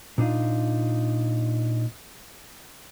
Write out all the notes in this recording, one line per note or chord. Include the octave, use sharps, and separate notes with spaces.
A#2 D4 D#4 F4